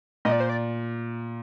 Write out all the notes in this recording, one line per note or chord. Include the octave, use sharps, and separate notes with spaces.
A#2 D#5
D5
C5
D5